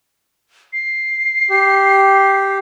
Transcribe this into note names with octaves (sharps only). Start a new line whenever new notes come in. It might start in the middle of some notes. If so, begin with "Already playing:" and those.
C7
G4